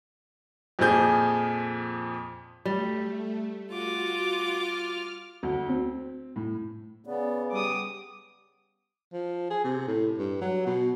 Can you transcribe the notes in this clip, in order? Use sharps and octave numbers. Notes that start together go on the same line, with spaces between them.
F2 A#2 F3 G#4 G6
G3 A3
F4 F#4 D6
F6
D2
C4
A2
C#3 B3 D5
G3 D6 D#6
F3
G#4
C3
A2
G2
F#3
B2